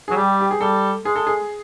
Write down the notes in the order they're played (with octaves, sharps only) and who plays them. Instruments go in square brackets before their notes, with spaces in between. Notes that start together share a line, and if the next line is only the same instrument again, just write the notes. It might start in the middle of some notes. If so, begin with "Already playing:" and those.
[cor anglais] F#3 [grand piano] G#4
[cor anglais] G3 [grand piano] G4
[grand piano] G4
G#4
[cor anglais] G3 [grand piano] A4
[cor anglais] G#3 [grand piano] G#4
[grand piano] A4
G#4